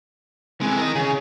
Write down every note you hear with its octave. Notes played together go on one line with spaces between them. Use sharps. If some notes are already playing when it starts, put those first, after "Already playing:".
C3 E3 G#3 A3
A#4 D#5
C#3 G#4